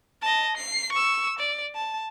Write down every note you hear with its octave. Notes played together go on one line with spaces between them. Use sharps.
D#5 A5
C7
C#6 E6
D5
A5